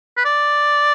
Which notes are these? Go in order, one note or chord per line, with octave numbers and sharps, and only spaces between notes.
B4
D5